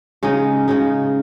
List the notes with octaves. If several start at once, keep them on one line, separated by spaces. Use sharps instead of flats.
C#3 G#3 D#4
C#3 G#3 D#4